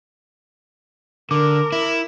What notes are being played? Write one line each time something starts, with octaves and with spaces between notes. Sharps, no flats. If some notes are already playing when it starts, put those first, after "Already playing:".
D3 A#4 D6
E4